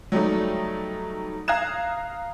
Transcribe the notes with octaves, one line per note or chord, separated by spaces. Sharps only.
F#3 G3 A3 D#4
F5 A#5 D#6 F#6 G#6 E7